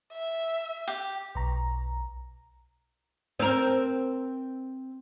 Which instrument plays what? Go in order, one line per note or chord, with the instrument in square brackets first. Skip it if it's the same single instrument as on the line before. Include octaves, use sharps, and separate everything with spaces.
[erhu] E5
[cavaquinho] G4
[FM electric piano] B1 A#5
[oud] C4 A#4